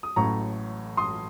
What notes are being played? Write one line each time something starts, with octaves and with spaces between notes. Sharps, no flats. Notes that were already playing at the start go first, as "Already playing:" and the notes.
D#6
A1 A2 F#3 A#5 C#6
C6 D#6